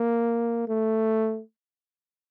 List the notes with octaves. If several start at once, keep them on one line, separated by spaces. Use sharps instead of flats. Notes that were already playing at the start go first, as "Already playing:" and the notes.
Already playing: A#3
A3